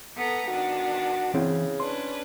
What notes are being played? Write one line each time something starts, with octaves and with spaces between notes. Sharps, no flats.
B3 A4 A#5
D#3 B3 D4 F#4
C#3 E3 C4 E4
C#4 D4 B4 C6